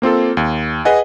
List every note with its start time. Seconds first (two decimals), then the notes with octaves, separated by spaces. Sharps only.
0.02 A#3 C4 F4 A4
0.37 D#2
0.85 G#4 B4 D#5 F#5 G#5